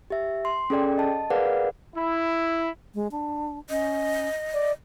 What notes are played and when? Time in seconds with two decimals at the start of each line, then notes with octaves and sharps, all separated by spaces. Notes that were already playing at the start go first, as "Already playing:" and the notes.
0.10 G4 E5
0.45 C6
0.70 C#4 G#4 A4 D5 G5
0.98 D#5 A5
1.30 G#4 A#4 B4 D5 F5 F#5
1.95 E4
2.95 G#3
3.11 D4
3.70 C#4 D#5
4.54 D5